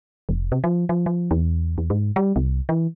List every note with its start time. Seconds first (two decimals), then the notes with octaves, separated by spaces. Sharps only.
0.29 F1
0.52 C3
0.64 F3
0.89 F3
1.06 F3
1.31 E2
1.78 E2
1.90 G#2
2.16 G3
2.36 C2
2.69 E3